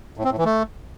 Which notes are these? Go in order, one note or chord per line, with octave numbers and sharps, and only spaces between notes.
A2
C4
A2
E3
A3